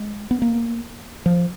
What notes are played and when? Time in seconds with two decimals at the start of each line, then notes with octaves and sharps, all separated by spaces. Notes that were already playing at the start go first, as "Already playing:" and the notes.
Already playing: G#3
0.31 B3
0.42 A#3
1.26 F3